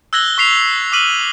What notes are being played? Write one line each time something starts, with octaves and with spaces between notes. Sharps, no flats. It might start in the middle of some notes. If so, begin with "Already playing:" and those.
E6 F#6 G#6 A#6 F#7 G7
C#6 B6 C7 F7
D6 F6 B6 D#7 F#7